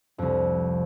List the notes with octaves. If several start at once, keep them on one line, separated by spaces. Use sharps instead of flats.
C2 F2